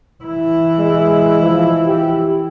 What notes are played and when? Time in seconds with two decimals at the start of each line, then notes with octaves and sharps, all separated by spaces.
0.24 E3 E4
0.79 G#3
1.42 F3
1.87 G4